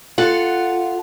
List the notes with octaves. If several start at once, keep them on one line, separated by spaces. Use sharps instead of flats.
F4 A4 F#5